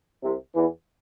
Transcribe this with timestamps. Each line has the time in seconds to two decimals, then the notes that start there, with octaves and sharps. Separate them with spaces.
0.23 C2 C3
0.55 E2 E3